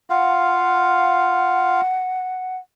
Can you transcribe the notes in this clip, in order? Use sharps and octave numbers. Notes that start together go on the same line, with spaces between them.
F4 F5 F#5